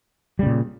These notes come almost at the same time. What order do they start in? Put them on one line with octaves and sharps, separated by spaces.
G3 C#3 A#2